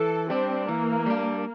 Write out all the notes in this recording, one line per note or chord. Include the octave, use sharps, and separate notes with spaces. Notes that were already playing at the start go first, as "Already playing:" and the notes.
Already playing: E3 A4
G3 C4 D4
E3 A#3
G3 D4